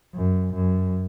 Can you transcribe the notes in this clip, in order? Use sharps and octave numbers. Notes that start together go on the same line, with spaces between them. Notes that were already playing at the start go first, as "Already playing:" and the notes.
F#2
F#2